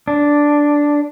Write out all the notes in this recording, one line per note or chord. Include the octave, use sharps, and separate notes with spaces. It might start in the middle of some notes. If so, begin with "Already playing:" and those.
D4